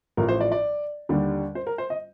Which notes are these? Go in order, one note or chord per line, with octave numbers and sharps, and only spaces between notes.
A1 A2 F3 A#4
C5
D5
D5
D#2 D3 G3 D4
C5
A#4
C5
D#5